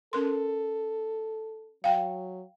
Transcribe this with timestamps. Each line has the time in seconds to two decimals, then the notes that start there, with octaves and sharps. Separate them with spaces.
0.13 C#4 A4 A#4 C6
1.84 F#3 F5 G5